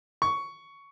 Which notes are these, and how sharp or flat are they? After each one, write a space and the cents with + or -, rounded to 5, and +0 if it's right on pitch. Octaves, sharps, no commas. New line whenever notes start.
C#6 +10